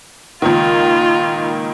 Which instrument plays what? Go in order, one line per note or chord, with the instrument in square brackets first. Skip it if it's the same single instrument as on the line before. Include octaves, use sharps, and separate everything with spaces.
[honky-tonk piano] C#2 A#2 D#3 [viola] F4